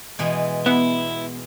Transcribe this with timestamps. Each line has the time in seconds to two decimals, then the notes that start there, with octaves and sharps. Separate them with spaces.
0.19 B2 E3 G#3
0.66 B3 E4